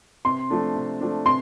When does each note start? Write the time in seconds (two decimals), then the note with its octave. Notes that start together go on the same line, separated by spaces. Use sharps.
0.25 C3 C6
0.50 F3 A3 D4
0.75 C3
1.01 F3 A3 D4
1.26 C3 C6